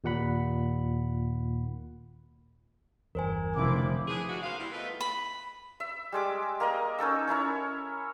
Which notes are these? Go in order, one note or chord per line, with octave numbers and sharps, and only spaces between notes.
D#2 A#2 F#5 B5
G1 E2 A#4 C5 G#5
F1 D3 F3 E4 D6
E3 F3 D4 G#4
G#2 G#3 D4 F4 F#4
A#3 B4 C5 F5
G3 A#3 C4 E4
A3 B3 C4 D#4 F4 B4
B5
E5
G3 G#3 D6
A#3 A#4 D#5
C#4 D#4 A4 E6
C#4 E4 A#4 C#5